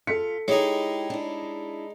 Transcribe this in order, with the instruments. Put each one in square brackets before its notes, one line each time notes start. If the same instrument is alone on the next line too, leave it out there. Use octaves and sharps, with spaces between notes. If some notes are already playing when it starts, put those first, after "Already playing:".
[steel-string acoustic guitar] F4 [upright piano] A4 B6 C#7
[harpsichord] G#3 D#4 [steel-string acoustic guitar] E4 G4 [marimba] C#5
[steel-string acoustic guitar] D4 E4